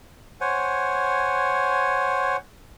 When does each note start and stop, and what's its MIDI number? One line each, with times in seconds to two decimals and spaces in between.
0.41 2.37 72
0.41 2.37 73
0.41 2.37 78
0.41 2.37 80